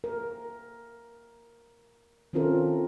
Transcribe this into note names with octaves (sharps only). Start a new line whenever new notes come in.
A#4
D#3 C4 C#4 F4 A4 A#4